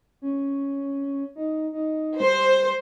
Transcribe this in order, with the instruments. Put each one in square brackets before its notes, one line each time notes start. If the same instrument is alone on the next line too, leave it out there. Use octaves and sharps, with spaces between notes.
[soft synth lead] C#4
D#4
D#4
[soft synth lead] G3 [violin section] C5